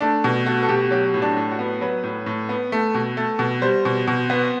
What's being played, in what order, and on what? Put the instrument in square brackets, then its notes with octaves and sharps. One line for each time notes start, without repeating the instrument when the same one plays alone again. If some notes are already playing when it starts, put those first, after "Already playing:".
[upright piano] A3 D4
B2
A3 F#4
A4
B2 G4
F#3 G4
A2
D4
A2
F#4
B3
F#3 B4
A2
A2
B3
A3
B2
A3
B2
G3 C5
B2
B2
B3